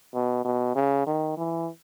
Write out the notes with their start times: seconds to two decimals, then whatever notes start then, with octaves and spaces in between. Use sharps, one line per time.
0.14 B2
0.45 B2
0.75 C#3
1.06 D#3
1.37 E3